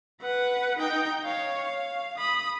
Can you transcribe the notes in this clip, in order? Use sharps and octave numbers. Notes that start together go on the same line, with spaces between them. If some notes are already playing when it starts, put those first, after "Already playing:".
B4 F#5
D#4 G5
C#5 F5
F5
B5 D#6